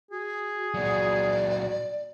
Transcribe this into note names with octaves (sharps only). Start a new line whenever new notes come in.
F#4 G#4
A#2 F#3 D5